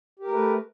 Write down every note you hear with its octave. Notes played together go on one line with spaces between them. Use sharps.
A3 G4 A#4 B4